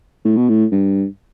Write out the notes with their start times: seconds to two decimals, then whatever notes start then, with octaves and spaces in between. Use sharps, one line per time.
0.25 A2
0.37 B2
0.49 A2
0.72 G2